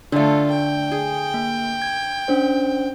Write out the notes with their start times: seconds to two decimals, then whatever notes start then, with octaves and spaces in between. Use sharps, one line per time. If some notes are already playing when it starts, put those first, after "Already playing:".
0.12 D3 A3 D4 F4 A4 D5
0.50 G5
0.92 G#4
1.34 A#3
1.82 G#6
2.28 C#4 D4 C5